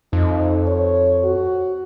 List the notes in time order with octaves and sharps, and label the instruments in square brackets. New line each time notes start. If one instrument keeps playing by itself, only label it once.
[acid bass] F2 [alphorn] D#4
[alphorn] C#5
F#4